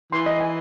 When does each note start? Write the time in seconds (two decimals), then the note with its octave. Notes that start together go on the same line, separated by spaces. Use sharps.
0.12 E3 C6
0.26 D#5
0.40 G#5